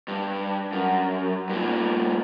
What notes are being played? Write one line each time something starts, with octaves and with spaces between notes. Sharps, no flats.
G2
F#2
G2 A#2